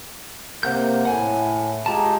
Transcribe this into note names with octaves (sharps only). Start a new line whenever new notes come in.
C3 A#3 C5 F#5 G6
A2 F#5 G#5
G#3 F4 G4 A5 A#5